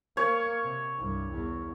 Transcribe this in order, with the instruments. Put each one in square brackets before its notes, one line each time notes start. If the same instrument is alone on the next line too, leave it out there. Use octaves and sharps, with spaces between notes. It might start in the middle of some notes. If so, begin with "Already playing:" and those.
[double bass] A#3 [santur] C#5
[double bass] C3
C2 G2
E2